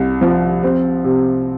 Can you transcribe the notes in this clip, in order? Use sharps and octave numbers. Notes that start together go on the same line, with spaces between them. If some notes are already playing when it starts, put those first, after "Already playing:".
Already playing: C2
F3
C4
C3